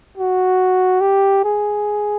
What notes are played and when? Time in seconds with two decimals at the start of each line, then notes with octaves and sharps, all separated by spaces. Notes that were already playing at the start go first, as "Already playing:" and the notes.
0.18 F#4
1.01 G4
1.44 G#4